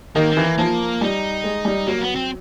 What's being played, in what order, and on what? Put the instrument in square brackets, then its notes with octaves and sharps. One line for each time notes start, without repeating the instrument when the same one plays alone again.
[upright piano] D#3 [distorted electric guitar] A#3
[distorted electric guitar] C4
[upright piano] E3
[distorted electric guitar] A#3
[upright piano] F3 [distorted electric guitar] A#3
[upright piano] G3 [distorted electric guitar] D#4
[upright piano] G#3
G3
[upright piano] F#3 [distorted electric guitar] A#3
[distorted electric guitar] B3
C4